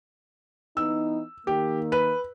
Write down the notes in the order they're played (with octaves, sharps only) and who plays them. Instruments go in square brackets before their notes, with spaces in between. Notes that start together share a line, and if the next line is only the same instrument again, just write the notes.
[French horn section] E3 B3 D#4 [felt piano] E6
[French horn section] D#3 A#3 [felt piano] G4
[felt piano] B4